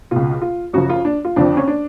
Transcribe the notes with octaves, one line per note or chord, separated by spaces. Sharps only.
C#2 B2 F4
F4
F#2 C#3 F3 F#4
F4
D4
F4
F2 D3 F3 D4
C#4
D4